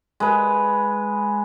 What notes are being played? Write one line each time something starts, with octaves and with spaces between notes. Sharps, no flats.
G#3 B4